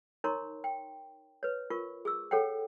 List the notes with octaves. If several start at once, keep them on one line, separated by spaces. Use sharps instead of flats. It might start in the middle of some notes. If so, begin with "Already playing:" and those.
D#4 A#4 C#5 A#5 C6 C#6
G5
B4 C#5
F4 A#4 C#6
G#4 C#6 E6
G#4 A4 C#5 F#5 G5